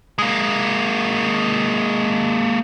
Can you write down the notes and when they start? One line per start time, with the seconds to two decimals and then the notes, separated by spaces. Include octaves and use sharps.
0.18 G#3 A#3